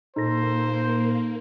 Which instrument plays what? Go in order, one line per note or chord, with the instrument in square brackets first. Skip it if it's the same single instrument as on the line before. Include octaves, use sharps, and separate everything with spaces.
[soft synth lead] A#2 [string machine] A#3 [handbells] D#4 A4 A#6 [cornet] C5